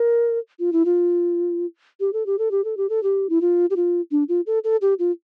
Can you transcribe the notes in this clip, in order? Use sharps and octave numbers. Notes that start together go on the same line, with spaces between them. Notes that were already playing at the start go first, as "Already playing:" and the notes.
Already playing: A#4
F4
E4
F4
G4
A4
G4
A4
G4
A4
G4
A4
G4
E4
F4
G4
F4
D4
F4
A4
A4
G4
F4